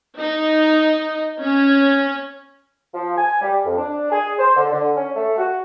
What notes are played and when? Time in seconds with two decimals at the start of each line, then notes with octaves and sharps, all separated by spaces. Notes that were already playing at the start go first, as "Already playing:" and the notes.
0.17 D#4
1.41 C#4
2.94 F3
3.17 G#5
3.41 G3
3.65 F2
3.77 D4
4.12 G#4
4.39 C5
4.57 D3
4.72 D3
4.97 C#4
5.16 A3
5.38 F#4